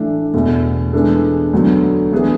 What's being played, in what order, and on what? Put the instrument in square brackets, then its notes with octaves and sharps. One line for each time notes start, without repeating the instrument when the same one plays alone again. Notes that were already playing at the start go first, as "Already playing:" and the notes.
Already playing: [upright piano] A2 E3 A3 D4 A4
E2 B2 A3
E3 G#3 B3 D4 A4
D2 D3 F#3 B3
E3 B3 D4 G#4